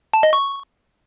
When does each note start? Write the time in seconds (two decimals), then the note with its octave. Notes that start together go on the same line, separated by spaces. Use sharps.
0.14 A5
0.23 D#5
0.33 C#6